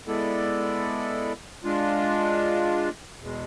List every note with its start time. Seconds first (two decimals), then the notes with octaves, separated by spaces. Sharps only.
0.07 G#3 B3 E4 A4 D5
1.64 G#3 D4 F4
3.20 E2 B2 G#3